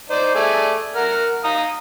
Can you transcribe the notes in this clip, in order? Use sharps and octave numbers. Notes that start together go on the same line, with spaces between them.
D#4 C5 D5
A3 G#4 D5
A#4 F#5 F6
F5 A#5 D#6